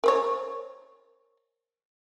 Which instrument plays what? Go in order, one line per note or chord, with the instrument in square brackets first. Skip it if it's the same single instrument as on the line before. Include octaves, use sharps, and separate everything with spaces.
[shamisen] A#4 C5 C#5